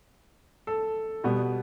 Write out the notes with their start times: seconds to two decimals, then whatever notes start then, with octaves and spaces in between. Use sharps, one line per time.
0.67 A4
1.24 B2 G3 B3